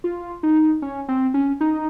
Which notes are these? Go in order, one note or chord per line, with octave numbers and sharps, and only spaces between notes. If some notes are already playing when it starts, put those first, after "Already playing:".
F4
D#4
C#4
C4
C#4
D#4